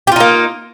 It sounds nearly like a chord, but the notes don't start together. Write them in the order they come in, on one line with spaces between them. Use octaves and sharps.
G4 F4 D#4 A#3